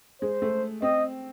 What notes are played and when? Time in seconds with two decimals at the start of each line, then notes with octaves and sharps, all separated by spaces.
0.22 G#3 C5
0.42 A3
0.82 C4 D#5